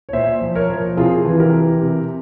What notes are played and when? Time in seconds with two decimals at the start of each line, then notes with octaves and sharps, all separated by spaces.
0.09 C#5
0.13 A#2 C5 E5
0.41 F3
0.55 A#4 C#5
0.69 F3
0.97 C3 F4 G#4
1.25 E3
1.40 G4 A#4
1.53 E3
1.81 C3